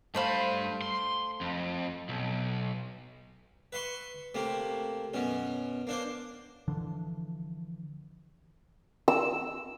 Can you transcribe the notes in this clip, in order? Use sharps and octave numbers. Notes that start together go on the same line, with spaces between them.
G2 A3 C5 F5 B5
C6
F2
B1
B4 E5 C6 C#6
C3 A3 A#3
F#2 B2 C#4
A#3 D4 C5
D3 E3 F3 D4
E6